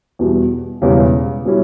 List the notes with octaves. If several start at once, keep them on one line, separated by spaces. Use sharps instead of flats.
E2 B2 G3
E1 E2 C#3 E3 G3
B2 G3 C#4 E4